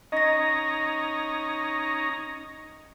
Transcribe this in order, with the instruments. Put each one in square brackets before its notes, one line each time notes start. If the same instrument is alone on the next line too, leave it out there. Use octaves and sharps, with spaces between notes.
[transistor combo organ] C#4 D#4 A#5 [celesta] D#5 A#6